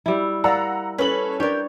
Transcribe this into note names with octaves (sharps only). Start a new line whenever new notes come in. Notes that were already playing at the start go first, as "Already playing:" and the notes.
G3 E4
A#4 D5 F5 F#5 A#5 E6
C#4 A4 B4 F#7
D4 G4 A#4 B4 C#5 D5